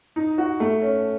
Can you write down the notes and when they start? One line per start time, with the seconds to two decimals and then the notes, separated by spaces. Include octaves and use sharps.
0.16 D#4
0.38 F#4
0.60 A3
0.82 C#4